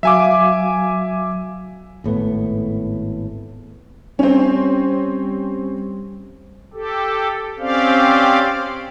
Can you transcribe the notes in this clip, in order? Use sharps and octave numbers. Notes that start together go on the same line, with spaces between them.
F#3 F#4 E5 F5 G#5 D6
G#1 A2 A3 B3
G3 C4 C#4
G4 A4
C4 C#4 G4 C5 D5 F5